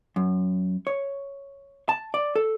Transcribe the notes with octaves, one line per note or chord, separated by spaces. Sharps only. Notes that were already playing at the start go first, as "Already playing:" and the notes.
F#2
C#5
A5
D5
A4